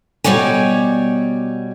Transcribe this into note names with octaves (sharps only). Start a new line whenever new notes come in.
B2 G3 C#5 D5 G#5